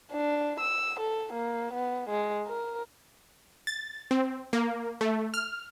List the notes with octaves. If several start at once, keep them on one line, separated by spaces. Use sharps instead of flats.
D4
E6
A4
A#3
B3
G#3
A#4
A6
C4
A#3
A3
F6